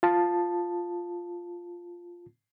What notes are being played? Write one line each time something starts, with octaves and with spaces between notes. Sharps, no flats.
F4 A5